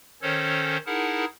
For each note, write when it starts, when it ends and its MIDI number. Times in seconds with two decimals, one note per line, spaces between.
0.22 0.77 51
0.22 0.77 61
0.22 0.77 69
0.22 0.77 72
0.22 0.77 73
0.86 1.25 63
0.86 1.25 64
0.86 1.25 68
0.86 1.25 70
0.86 1.25 78
0.86 1.25 81